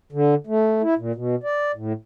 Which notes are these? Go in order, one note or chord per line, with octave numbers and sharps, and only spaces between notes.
D3
A3
E4
A#2
B2
D5
A2